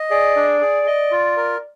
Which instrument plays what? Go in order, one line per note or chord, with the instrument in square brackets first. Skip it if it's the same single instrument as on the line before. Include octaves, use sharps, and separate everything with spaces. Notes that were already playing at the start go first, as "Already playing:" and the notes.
Already playing: [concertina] D#5
[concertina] G#4 [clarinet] D5
[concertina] D4
G#4
D#5
F4
A#4